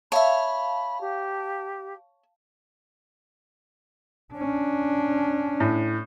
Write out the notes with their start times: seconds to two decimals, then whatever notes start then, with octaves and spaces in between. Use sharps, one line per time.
0.12 C#5 E5 F5 A5 B5
1.01 G4
4.34 C#4 D4
5.60 A2